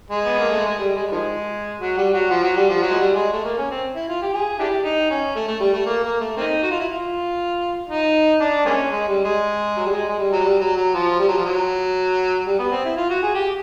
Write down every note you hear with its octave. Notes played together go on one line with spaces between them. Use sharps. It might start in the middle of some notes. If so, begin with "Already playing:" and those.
G#3
B3
A#3
A3
G#3
G3
G#3
G3
D#3 F3 G#3
F#3
G3
F#3
F3
F#3
G3
F3
F#3
G#3
G3
G#3
A3
A#3
C#4
C4
E4
F4
G4
G#4
D4 E4 G4
D#4
C#4
A3
A3
G3
A3
A#3
A#3
A3
A#3 C4 D#4
F#4
F4
E4
F4
D#4
D4
G#3 A#3 C#4
G#3
G3
G#3
F#3
G3
G#3
G#3
G3
F#3
G3
F#3
F#3
F3
G3
F#3
F3
F#3
G3
B3
C4
E4
F4
F#4
G#4
G4